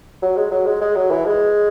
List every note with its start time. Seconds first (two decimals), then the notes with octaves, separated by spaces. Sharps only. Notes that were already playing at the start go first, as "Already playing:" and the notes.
0.22 F#3
0.36 G#3
0.51 F#3
0.66 G#3
0.81 G#3
0.95 F#3
1.11 E3
1.26 G#3